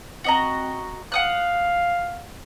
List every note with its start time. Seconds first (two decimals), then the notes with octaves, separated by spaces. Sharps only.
0.24 C4 F#4 D#5 A#5
1.12 F5 F#5 D#6 F#6